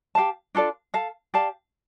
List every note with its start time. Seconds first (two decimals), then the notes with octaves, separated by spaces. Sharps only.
0.15 G4 F5 A5
0.55 D4 F4 A4 D5
0.94 A4 F5 A5
1.34 G4 D5 F5 A5